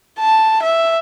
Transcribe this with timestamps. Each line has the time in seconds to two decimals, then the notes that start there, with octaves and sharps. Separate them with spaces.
0.19 A5
0.62 E5